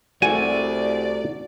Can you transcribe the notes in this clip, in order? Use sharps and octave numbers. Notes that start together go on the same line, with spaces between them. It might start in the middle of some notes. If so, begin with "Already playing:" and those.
C2 A3 F#4 D5 G#5